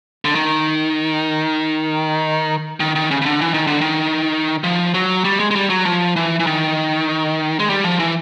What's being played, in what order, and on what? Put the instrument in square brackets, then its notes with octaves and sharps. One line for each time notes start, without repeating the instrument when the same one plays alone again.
[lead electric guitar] D3
D#3
D#3
D#3
C#3
C#3
D3
E3
D#3
D3
D#3
F3
F#3
G3
G#3
G#3
G3
F#3
F3
E3
E3
D#3
G#3
G3
F3
E3